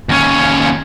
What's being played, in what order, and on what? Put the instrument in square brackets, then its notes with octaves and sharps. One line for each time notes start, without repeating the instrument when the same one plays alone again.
[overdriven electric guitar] D#2 C#4